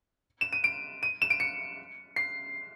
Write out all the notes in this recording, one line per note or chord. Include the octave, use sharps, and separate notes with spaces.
E7
D#7
D7
D#7
E7
D7
C#7
C7